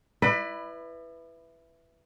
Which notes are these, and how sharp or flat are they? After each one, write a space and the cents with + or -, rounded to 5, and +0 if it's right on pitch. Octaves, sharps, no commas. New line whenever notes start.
E4 +10 B4 +5 D5 +45